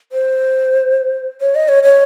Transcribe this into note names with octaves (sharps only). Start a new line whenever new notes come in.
C5
C#5
D#5
C#5
C#5